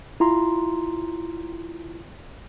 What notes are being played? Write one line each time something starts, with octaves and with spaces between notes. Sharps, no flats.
E4 F4 A#5 C6